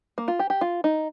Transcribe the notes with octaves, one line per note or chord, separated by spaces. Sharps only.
A#3
F4
G4
G4
F4
D#4